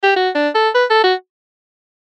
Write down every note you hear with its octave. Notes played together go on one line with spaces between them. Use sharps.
G4
F#4
D4
A4
B4
A4
F#4